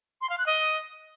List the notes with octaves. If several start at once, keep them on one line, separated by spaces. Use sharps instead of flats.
C6
F5
F#6
D#5